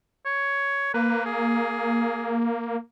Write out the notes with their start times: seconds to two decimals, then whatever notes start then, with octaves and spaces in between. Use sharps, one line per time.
0.26 C#5
0.94 A#3 B4
1.25 G#4